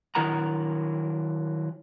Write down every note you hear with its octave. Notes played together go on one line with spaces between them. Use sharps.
D#3 F#3 E4 A#4 F#5 A#5